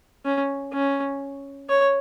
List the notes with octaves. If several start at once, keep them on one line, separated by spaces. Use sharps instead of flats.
C#4
C#4
C#5